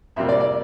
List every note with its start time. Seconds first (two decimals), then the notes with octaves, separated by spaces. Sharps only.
0.16 F2 C3 G3 A#3 E5
0.29 D5
0.40 D5